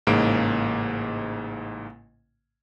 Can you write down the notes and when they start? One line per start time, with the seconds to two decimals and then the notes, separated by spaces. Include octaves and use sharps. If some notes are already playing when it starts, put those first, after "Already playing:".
0.07 A1 G#2 C#3 A#3 D7